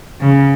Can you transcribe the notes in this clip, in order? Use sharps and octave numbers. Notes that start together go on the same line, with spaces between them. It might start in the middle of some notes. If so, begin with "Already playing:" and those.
C#3